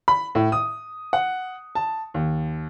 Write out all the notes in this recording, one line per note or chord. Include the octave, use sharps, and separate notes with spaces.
B5
A2
D#6
F#5
A5
D#2